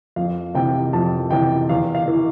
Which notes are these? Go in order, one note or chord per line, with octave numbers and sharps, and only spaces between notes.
F2 F5
C3 E3 G5
F2 A5
C3 E3 G5
E2 F5
F5
E3